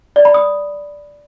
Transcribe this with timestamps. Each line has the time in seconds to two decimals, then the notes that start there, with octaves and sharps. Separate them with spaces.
0.16 D5
0.25 B5
0.34 D#6